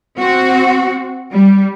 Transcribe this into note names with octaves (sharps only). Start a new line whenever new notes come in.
C4 F#4
G3